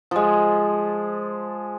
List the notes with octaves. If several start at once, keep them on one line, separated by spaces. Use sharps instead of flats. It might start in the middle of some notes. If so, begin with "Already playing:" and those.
F3 G#3